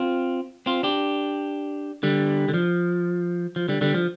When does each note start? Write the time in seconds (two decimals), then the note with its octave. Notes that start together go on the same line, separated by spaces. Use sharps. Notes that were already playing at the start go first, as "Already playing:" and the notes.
Already playing: C4 F4
0.66 C4 F4
0.83 D4 G4
2.03 D3 G3
2.49 D3
2.54 F3
3.56 F3
3.69 D3 G3
3.81 D3 G3
3.94 F3